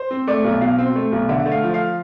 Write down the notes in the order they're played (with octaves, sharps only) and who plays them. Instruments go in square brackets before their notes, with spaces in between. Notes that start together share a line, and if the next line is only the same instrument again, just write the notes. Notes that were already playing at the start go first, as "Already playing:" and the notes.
Already playing: [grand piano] C5
C4
A3 D5
B1
B2 F5
C4
A3
B1
D3 E5
A3
F5
F3
F5